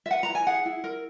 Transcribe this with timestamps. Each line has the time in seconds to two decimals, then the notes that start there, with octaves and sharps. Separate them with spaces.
0.06 E5
0.11 B4 F#5
0.23 A#5
0.29 E4
0.35 G#5
0.47 G#4 F#5
0.65 E4
0.84 A#4